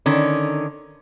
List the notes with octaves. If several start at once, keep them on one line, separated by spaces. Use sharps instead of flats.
D3 D#3 C#4